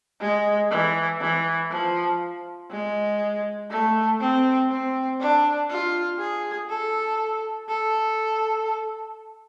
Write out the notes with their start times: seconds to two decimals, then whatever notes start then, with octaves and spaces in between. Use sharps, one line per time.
0.21 G#3
0.70 E3
1.20 E3
1.70 F3
2.71 G#3
3.70 A3
4.20 C4
4.70 C4
5.20 D4
5.70 F4
6.19 G#4
6.69 A4
7.68 A4